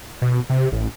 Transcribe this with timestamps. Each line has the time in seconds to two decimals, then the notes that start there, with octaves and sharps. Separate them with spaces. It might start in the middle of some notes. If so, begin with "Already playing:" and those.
0.22 B2
0.50 C3
0.72 A1